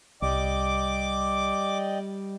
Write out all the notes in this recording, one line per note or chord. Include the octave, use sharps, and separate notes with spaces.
C2 G3 D5 D#5 G5 D6